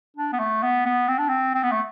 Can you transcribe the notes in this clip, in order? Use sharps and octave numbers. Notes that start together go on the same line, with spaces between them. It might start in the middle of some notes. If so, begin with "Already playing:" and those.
D4
B3
A3
B3
B3
C4
D4
C4
C4
B3
A3